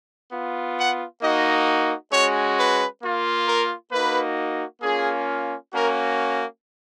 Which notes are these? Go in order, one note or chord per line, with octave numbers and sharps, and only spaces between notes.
B3 F4
F#5
A#3 D#4 F#4 D#5
G#3 C#4 F#4 C#5
B4
A#3 F4
A#4
A#3 D#4 F#4 B4
A#3 C#4 F4 G#4
A#3 C#4 F#4 A#4